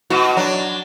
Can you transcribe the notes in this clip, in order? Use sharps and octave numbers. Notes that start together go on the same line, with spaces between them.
B2 F#4
F#3 D4